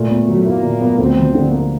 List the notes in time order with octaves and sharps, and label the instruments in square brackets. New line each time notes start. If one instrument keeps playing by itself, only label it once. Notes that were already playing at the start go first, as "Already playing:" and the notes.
Already playing: [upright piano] A#2 [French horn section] A3
[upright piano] B3
F#3
[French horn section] A#3 [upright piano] E4
[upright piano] A#2
B3
[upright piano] D2 [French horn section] C4
[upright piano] F3
D3
A#3